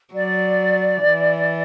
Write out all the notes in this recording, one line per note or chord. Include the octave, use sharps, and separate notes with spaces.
F#3 D5
E3